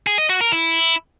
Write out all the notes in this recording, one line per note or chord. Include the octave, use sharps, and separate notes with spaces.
G#4
D#5
F#4
A#4
E4